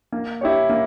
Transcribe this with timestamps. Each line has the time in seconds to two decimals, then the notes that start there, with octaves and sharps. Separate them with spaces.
0.12 A#3
0.41 E4 G4 C#5
0.69 A#3